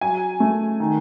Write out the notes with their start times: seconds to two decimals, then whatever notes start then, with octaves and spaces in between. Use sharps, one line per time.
0.01 F#3 G#5
0.40 A3
0.80 D#3